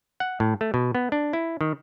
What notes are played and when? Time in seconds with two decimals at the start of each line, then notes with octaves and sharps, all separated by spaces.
0.20 F#5
0.40 A2
0.61 A3
0.74 B2
0.95 B3
1.12 D4
1.33 E4
1.61 D#3